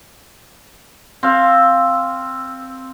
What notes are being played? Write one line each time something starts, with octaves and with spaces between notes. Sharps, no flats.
C4 F5